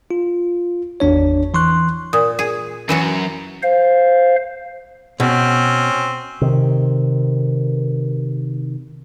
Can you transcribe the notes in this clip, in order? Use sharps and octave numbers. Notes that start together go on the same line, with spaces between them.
F4
G#1 E2 D4 C#5
E3 C6 C#6 F#6
A#2 D#6
G#4
F#2 E3 F#3 F#4
C5 F5
B2 C4 C#4
C3 D#3